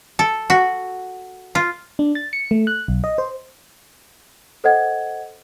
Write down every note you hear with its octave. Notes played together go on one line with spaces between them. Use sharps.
A4
F#4
F4
D4
A6
C#7
A3
F#6
B1
D#5
C5
A4 C5 D#5 F#5 G#6